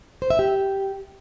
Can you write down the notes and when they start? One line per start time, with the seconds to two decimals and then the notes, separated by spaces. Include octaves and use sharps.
0.22 C5
0.30 E5
0.39 G4